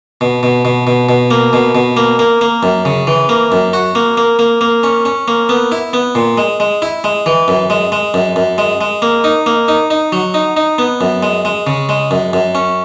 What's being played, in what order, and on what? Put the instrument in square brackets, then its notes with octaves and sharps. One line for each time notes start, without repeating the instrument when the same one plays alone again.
[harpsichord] B2
B2
B2
B2
B2
A#3
B2
B2
A#3
A#3
A#3
F#2
C#3
E3
A#3
F#2
F#4
A#3
A#3
A#3
A#3
C#4
C#4
A#3
B3
E4
B3
A#2
G#3
G#3
E4
G#3
E3
F#2
G#3
G#3
F#2
F#2
G#3
G#3
A#3
D#4
A#3
D#4
D#4
F#3
D#4
D#4
B3
F#2
G#3
G#3
C#3
G#3
F#2
F#2
C#4